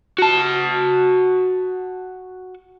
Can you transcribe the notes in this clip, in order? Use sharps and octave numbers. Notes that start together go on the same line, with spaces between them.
F#4 A5